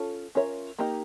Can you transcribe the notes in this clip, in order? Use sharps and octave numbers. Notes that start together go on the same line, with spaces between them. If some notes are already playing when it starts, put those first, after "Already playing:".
Already playing: C#4 F4 A4
C#4 F4 A#4 C#5 E5
A#3 D#4 G4 A#4 D#5